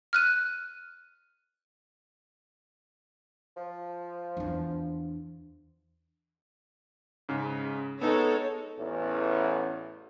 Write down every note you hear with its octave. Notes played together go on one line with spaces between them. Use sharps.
F6 F#6 D#7
F3
E2 D4
G#2 C#3
G#3 B3 D#4 A4 C#5
A1 E2